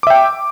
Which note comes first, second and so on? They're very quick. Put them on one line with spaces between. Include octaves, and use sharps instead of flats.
D6 E5 G5